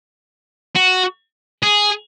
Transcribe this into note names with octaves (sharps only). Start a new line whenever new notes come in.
F#4
G#4